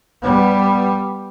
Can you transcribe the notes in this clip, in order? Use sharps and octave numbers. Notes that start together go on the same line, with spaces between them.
G3 B3